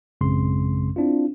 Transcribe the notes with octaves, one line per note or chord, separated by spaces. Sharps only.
A1 F#2 C#3 G#3 C4 C6
C4 D4 E4 F4